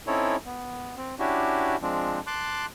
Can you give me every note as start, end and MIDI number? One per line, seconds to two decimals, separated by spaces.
0.07 0.36 60
0.07 0.36 61
0.07 0.36 63
0.07 0.36 64
0.07 0.36 69
0.07 0.36 73
0.46 0.95 59
0.97 1.15 60
1.19 1.76 61
1.19 1.76 62
1.19 1.76 64
1.19 1.76 66
1.19 1.76 67
1.82 2.21 53
1.82 2.21 56
1.82 2.21 60
1.82 2.21 62
2.27 2.66 81
2.27 2.66 84
2.27 2.66 86
2.27 2.66 90